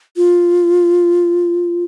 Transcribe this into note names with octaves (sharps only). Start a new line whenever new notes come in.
F4